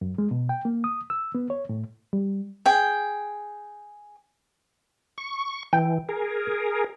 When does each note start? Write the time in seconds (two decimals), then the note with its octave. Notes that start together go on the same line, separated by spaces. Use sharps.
0.01 F#2
0.18 G#3
0.31 B2
0.49 G5
0.65 A#3
0.84 D#6
1.10 E6
1.35 B3
1.50 C#5
1.69 A2
2.13 G3
2.66 G#4 G5
5.18 C#6
5.73 E3 G5
6.09 G#4 A#4